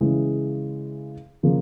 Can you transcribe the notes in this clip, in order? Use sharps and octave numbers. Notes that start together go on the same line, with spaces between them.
C#3 E3 G#3
C#3 F3 A#3